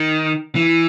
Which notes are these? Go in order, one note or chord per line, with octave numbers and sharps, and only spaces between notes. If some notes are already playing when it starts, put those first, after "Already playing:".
Already playing: D#3
E3